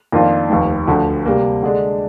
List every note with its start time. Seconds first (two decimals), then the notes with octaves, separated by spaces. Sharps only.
0.12 F2 D#3 A#3 D4 F4
0.50 F1 D#2 D#3
0.87 D2 D3 F3
1.26 C3 G3 A#3
1.63 D3 G#3 D4